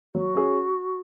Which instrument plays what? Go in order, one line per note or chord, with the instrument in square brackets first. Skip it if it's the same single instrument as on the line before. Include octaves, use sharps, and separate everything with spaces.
[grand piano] F#3 [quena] F#4
[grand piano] C#4 G#4